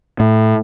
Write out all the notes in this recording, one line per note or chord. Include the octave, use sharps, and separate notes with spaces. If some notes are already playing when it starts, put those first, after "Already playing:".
A2